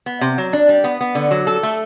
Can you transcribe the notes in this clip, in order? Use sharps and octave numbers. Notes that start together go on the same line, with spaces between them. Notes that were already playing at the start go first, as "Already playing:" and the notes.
B3
C3
F#3
D4
G3
B3
B3
D3
F#3
A4
A3